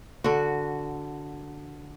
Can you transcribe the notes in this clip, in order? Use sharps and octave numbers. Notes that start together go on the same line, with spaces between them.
D3 F#4